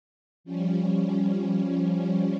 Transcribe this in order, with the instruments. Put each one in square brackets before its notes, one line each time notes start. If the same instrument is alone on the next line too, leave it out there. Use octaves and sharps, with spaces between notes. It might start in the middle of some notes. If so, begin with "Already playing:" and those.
[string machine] F3 G3 C#4